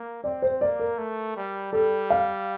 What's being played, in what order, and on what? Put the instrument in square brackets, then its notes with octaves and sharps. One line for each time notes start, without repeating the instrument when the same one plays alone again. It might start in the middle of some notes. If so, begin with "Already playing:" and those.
Already playing: [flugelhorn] A#3
[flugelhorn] C4 [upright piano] D5
[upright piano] C5
[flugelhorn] A#3 [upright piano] D5
[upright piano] A#4
[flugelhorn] A3
G3
[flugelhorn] G3 [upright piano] A4
[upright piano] F5